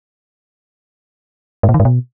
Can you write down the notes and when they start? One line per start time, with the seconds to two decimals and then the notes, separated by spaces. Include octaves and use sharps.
1.63 G#2
1.69 A#2
1.74 D#3
1.80 G#2
1.85 B2